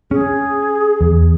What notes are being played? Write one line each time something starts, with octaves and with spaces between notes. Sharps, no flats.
C#4 G#4
E2